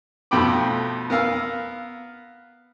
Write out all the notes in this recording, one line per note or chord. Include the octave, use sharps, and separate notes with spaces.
F2 B2 A3 G5 B5 D6
B3 A#4 F5 E6